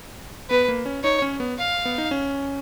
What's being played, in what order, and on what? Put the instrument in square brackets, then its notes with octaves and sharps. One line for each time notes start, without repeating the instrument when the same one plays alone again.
[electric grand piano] B3 [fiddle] B4
[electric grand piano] A#3
C#4
[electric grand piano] D#4 [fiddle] C#5
[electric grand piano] C#4
B3
[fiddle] F5
[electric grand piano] B3
D#4
C#4